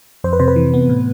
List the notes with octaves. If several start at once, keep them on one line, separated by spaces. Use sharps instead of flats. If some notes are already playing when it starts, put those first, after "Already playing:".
F2 C5
B4
C3 C5
B4
E3
B3
A2